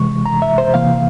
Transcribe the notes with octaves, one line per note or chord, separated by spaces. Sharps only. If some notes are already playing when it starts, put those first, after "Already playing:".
Already playing: C3 E3 G#3 C#6
A#5
E5
C5
C3 E3 A#3 F5